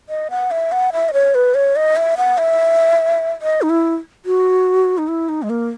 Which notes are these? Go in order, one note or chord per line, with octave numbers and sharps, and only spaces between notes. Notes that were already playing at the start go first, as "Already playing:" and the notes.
D#5
F#5
E5
F#5
E5
D#5
C#5
B4
C#5
D#5
E5
F#5
E5
D#5
D#4
E4
F#4
D#4
E4
D#4
G#3
A#3